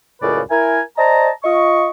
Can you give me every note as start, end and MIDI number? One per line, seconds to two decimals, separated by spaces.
0.22 0.41 37
0.22 0.41 42
0.22 0.41 45
0.22 0.41 49
0.22 0.41 71
0.22 0.41 74
0.50 0.81 64
0.50 0.81 70
0.50 0.81 80
0.97 1.30 72
0.97 1.30 74
0.97 1.30 75
0.97 1.30 81
0.97 1.30 82
1.44 1.90 65
1.44 1.90 75
1.44 1.90 85